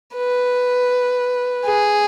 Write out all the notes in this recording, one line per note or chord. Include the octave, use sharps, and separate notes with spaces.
B4
G#4